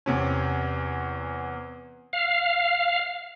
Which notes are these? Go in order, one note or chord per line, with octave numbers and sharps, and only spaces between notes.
E2 C3 C#4
F5